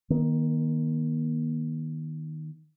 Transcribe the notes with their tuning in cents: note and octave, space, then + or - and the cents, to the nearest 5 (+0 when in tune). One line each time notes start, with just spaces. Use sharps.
D#3 +0 A#3 +45